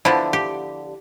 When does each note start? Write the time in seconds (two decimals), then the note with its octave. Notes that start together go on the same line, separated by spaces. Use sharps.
0.05 D3 F3 B3 E4
0.33 G4